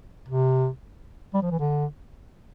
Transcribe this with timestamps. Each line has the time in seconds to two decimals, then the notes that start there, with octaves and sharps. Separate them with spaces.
0.28 C3
1.34 G3
1.42 F3
1.51 E3
1.59 D3